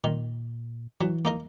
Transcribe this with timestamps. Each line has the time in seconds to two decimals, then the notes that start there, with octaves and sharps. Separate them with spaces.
0.04 A#2 D#3
1.01 E3 F#3
1.25 A#3 D#4 A#4